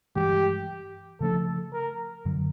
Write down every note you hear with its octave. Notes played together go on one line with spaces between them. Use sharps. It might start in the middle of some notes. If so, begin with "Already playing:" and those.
G2 E3 G#3 G4
C#3 F3 A3 D4 A4
A#4
F#2 D3 F#3